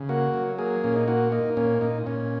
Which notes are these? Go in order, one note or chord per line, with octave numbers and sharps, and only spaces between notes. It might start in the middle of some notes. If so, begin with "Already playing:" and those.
Already playing: C#3
A#3 F#4
F#3
A#3 G#4
A#2 C#4
D#4
A#3 F#4
A#3 D#4
A#2 C#4
A#2 D#4
A#2 C#4